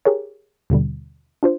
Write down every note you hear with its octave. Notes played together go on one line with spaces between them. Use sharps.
G4 G#4 A#4 C#5
D#2 B2 D3 G3
D4 F4 C5